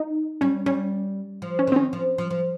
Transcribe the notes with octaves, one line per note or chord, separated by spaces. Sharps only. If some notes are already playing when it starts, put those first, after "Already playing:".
Already playing: D#4
G3 C#4
G3 C#4
F3
C#4
D#3 C4
C#4
F3
F3
F3